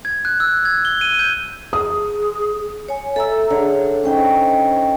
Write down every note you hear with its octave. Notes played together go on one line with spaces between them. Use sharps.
G#6
F#6
E6
G#6
G7
D#7
G6
G#4 D#6
C#5 G#5
A4 E5 A#5 E6
D3 G#4 C#5
C#4 D#4 C5 G5